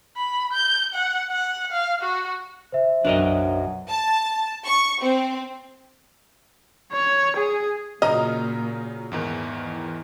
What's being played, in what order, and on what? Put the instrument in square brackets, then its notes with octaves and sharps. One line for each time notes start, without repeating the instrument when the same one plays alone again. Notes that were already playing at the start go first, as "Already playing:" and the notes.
[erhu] B5
G6
F#5
F#5
F5
F#4
[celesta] C5 E5
[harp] B1 F#2 [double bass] F#3 [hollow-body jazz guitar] D4 A#4 D#5
[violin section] A5
C#6
C4
[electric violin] C#5
G#4
[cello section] A#2 [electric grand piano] C#3 F#3 [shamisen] D#5 [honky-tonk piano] A#5 D#6 F6
[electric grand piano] E2 G#2 D#3 [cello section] E3